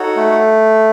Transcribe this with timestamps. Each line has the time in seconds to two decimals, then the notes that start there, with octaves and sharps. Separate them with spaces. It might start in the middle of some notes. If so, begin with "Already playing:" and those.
Already playing: D#4 F#4 A4 C#5 F#5
0.17 A3